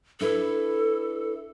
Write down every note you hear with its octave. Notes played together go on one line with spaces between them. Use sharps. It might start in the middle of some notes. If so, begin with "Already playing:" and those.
D4 E4 A4 B4